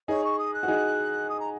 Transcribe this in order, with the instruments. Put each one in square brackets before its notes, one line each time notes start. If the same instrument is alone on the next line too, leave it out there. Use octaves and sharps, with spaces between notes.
[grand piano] D#4 G#4 [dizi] C#5
[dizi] C#6
D#6
F#6
[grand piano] F#4
D#4 G#4
[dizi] D#6
A#5